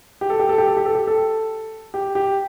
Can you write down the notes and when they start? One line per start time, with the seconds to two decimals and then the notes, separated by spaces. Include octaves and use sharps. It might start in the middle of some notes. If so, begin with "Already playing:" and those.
0.21 G4
0.30 A4
0.39 G4
0.49 A4
0.58 G4
0.67 A4
0.76 G4
0.86 A4
0.95 G4
1.07 A4
1.94 G4
2.15 G4